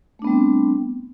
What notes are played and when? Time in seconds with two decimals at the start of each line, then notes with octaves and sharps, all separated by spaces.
0.19 A3
0.22 D4
0.25 B3
0.27 G3
0.30 C4